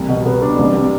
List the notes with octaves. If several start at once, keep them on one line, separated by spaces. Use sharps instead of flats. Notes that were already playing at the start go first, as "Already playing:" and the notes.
Already playing: C2
B2
B3
D4
C2
C3